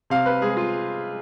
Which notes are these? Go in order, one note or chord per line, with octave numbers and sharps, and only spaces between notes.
C3 F5
B4
G#3 G#4
F4